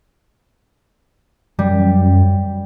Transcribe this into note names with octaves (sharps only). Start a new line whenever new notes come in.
F#2 G3